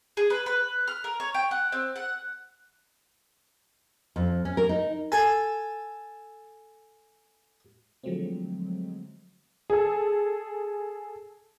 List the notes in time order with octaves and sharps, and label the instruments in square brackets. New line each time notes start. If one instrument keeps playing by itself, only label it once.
[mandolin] G#4
B4
B4
F6
A#4
C#5
G5
F#5
C4
F#5
[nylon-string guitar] F2
C#4
A#4
D#4
[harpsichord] A4 G#5
[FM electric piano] D3 F3 F#3 G#3 A3 C4
[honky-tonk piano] G#4 A4